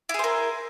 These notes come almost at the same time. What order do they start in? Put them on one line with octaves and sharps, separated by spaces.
E4 G#4 C5 A#4